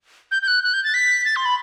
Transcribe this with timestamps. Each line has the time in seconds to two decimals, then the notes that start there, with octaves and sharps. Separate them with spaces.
0.31 G6
0.42 G6
0.47 F#6
0.63 F#6
0.73 G6
0.84 A6
0.94 B6
1.25 A6
1.36 C6
1.45 B5